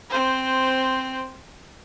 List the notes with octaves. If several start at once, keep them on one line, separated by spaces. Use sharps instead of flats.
C4 C5